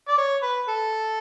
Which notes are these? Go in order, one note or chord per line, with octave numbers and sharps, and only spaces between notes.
D5
C#5
B4
A4